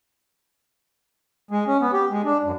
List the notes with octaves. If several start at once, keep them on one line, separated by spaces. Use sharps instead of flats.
G#3
C#4
B3
G4
G#3
D4
F#2